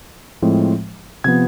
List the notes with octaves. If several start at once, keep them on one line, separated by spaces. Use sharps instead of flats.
A2 F3 G#3 C4
C3 F3 B3 G#6